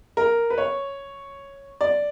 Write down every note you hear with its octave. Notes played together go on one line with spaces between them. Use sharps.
A#4
B4
C#5
D5